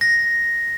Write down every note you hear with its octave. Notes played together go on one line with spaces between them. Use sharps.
A#6